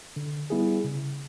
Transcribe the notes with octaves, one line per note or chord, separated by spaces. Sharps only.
D3
G3 B3 E4 G#4
C#3